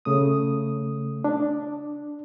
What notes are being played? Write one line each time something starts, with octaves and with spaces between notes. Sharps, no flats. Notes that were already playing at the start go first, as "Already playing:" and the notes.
C#3 A3 D#6
D4